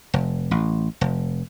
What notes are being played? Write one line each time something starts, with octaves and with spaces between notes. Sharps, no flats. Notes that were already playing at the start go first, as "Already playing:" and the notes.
F1
A1
F1